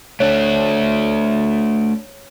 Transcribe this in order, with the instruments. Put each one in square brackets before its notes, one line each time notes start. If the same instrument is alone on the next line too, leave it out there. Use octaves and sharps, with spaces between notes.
[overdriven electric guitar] A3 D4 [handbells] C#5